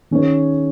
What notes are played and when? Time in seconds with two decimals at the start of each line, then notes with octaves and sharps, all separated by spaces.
0.11 D#3 C#4 G#4 C#5